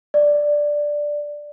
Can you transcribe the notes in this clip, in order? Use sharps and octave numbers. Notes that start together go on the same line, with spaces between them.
D5